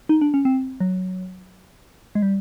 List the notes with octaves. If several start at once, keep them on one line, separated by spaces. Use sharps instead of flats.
D#4
D4
C#4
C4
F#3
G#3
G3